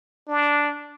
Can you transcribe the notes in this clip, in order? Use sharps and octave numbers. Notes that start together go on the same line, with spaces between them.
D4